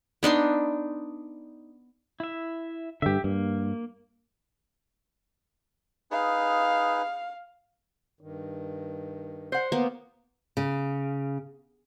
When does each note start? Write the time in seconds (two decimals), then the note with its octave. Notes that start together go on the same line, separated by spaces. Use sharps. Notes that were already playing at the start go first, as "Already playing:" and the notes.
0.23 B3 D4 D#4 C6
2.20 E4 E5
3.02 G2 D3 G4 E5
3.24 G2 A#3
6.11 D#4 G#4 B4 F5
8.21 G2 D#3
9.52 C5 F#5
9.72 A#3 B3
10.57 C#3